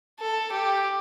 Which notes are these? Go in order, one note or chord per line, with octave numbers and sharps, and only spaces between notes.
A4
G4